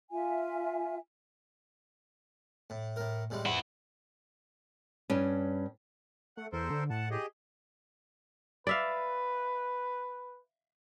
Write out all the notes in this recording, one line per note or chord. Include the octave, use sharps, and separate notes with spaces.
F4 E5 G#5
A2
A2 A#4
A2 G3 G#3
F2 E4 F#5
G2 C#4
A3 F#5
E2 A4 A#4 C5
D3
A2 F#5 A5
G4 G#4 D#5
B4 D5 E5 F5